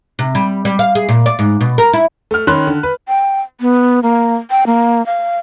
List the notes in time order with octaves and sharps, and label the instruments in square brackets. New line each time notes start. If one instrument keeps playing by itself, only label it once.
[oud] C3
G3
G3
F5
G#4
A#2
D5
G#2
B2
A#4
E4
[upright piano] A3 F6
D#3 C#4 B5 C6 F#6
D3
B4
[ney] G5
B3
A#3
G5
A#3
F5